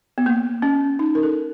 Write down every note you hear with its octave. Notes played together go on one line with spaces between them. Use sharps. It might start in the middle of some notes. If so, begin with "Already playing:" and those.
B3
A#3
C#4
D#4
A#4
A4